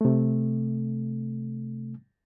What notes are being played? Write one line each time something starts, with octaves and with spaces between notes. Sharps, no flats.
C3 A3